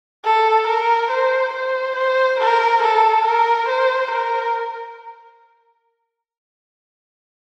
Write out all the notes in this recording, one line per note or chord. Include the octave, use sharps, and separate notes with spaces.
A4
A#4
C5
C5
C5
A#4
A4
A#4
C5
A#4